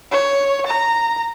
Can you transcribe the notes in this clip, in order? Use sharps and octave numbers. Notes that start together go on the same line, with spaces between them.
C#5
A#5